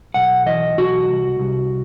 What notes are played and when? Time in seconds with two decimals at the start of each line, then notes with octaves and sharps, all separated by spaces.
0.14 B1 F#5
0.46 E3 D#5
0.78 B1 F#4
1.09 C2
1.39 C2